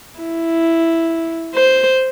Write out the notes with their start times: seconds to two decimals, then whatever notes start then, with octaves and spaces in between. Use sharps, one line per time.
0.19 E4
1.55 C5